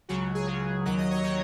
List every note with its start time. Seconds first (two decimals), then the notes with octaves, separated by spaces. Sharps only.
0.09 C#2 C#3 F#3 F#4
0.35 G#4
0.47 C#2 C#3 F#3
0.85 D#2 D#3 F#3 F#5
0.98 D#5
1.11 C#5
1.23 D#3 F#3 D#5